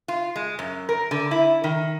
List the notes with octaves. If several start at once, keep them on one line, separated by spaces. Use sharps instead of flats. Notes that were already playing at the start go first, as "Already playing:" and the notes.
F4
G#3
F#2
A#4
D3
E4
D#3